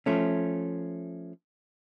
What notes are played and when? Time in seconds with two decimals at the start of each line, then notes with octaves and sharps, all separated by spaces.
0.06 F3 A3 C#4